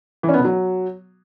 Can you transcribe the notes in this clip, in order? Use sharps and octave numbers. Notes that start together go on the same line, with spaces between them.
E3
C#4
B3
B2
F#3